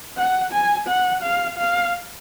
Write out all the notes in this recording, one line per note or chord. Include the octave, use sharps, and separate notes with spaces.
F#5
G#5
F#5
F5
F5